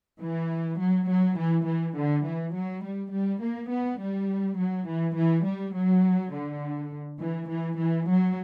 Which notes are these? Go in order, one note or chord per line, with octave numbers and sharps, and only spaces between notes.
E3
F#3
F#3
E3
E3
D3
E3
F#3
G3
G3
A#3
B3
G3
F#3
E3
E3
G3
F#3
D3
E3
E3
E3
F#3